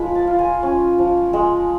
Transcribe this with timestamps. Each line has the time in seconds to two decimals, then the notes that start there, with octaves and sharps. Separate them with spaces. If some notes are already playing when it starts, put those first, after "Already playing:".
Already playing: F3 G#3 B5
0.15 A5
0.27 F4
0.39 G#5
0.63 C#4
0.98 F3
1.33 G#3